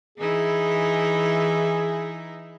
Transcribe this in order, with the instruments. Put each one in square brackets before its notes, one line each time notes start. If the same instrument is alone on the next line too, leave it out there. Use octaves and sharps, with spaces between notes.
[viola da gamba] E3 D#4 E4 [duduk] G#4